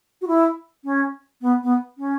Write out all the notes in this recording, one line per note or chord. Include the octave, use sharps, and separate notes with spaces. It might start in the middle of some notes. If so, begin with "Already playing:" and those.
F#4
E4
C#4
B3
B3
C#4